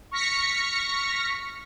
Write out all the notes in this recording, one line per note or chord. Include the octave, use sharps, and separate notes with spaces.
C#6 F6 A#6 B6 C#7